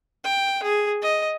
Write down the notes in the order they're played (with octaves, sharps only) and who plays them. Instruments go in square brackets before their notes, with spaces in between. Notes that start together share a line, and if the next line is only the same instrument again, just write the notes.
[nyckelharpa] G5
G#4
D#5